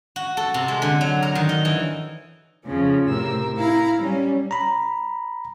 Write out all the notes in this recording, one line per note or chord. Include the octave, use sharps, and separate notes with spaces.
F#4
A4
C3
G#3
D3
F#3
A#4
D#3
D#5
E3
F2 C#3 F3 C#4
A2 C3 A#4 E6
E4 F5 A#5
G3 C#4
A#5 B5